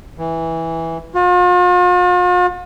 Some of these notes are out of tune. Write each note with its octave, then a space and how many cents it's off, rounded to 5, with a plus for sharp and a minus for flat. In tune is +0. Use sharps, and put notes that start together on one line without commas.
E3 -10
F4 +45